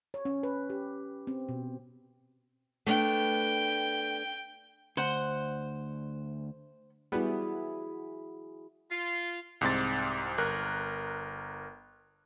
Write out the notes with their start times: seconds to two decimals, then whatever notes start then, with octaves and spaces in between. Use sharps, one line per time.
0.14 C#5
0.25 C#4
0.43 B4
0.70 G4
1.27 C4
1.49 B2
2.87 A3 B3 D4 G5
4.97 D2 C5 F#5
7.12 G3 B3 E4 F#4 G#4
8.90 F4
9.61 C2 G#2 C4 A6
10.38 G1 A#4 F#6